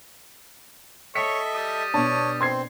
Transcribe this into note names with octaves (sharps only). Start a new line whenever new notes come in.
A4 C#5 D#5 E5 B6 C#7
G3 D#6
B2 D4 C#5 A5
C4 C6 G#6 C7